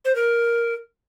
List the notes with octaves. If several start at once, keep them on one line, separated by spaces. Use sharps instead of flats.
C5
A#4